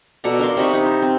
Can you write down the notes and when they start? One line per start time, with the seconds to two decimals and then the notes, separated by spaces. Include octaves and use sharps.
0.24 B2 A4 D5 A#5
0.39 D4 A#4 F5 C6
0.57 C3 D#4 B5 C#6
0.74 D#4
0.86 C5
1.02 C4